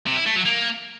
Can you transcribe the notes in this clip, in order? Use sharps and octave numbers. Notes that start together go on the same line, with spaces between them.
C3
E4
A3
F#3
A#3